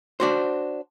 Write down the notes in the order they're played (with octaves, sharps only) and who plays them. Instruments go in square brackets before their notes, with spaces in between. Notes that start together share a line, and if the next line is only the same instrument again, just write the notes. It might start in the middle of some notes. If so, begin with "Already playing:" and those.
[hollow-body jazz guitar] D4 F#4 C5